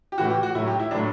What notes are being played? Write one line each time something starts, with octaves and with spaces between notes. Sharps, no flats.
G4
A2 E3 F#4
G4
F#4
A2 F#3 E4
G4
E4
A2 F#3 D4